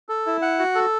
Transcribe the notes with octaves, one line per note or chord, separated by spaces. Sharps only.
A4
E4
F#5
F#4
A4